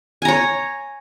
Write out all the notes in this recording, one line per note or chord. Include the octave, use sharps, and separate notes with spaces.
C#5 G#5 A#5